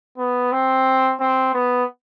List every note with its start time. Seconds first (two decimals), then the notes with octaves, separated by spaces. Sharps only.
0.18 B3
0.52 C4
1.20 C4
1.54 B3